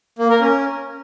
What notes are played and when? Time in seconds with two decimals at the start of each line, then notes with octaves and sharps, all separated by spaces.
0.19 A#3
0.29 A#4
0.40 C#4